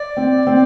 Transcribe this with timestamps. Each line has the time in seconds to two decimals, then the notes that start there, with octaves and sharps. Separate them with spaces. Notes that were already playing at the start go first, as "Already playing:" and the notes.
Already playing: D5
0.17 C4
0.47 C4